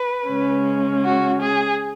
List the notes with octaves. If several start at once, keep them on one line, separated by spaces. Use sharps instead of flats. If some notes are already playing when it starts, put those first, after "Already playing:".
Already playing: B4
C#3 G#3 C#4
F#4
G#4